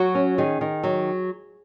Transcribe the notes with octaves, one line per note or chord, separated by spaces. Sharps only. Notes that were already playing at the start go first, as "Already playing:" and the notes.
Already playing: F#3 F#4
C#4
D#3 G#4
D#3
F#3